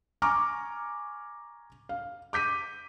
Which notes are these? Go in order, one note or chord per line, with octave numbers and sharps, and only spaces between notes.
G#5 A#5 C#6 D6 F6
F5
D6 G6 B6 D#7